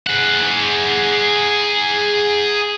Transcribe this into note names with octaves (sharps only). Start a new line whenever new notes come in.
G#4 F#5